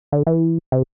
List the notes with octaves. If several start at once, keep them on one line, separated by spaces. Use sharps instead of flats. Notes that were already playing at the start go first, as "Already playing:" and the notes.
D3
E3
C3